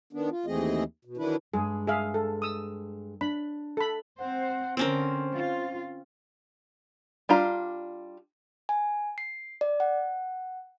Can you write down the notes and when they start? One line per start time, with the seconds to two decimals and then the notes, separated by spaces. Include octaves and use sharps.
0.13 D#3 B3 D4
0.31 F4
0.46 D#2 E3 A3 C4 G#4 D#5
1.05 B2
1.17 D#3 E3 F#3 D4 E4 B4
1.54 G2 G#3 G#4
1.87 G#4 E5 F5
2.14 A4
2.42 D#6 E6
3.21 D4 B5
3.77 A4 B5
4.20 C4 C5 F#5
4.77 D3 C4 C#4 A#4 C5
5.36 F4
7.29 G3 D4 F4 A#5
8.69 G#5
9.18 C7
9.61 D5
9.80 F#5